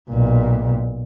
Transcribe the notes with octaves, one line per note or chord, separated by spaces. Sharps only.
B1 A#2